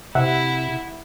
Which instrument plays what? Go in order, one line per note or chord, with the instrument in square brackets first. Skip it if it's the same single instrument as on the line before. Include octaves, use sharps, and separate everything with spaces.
[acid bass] C3 [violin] E4 [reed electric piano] E5 F#5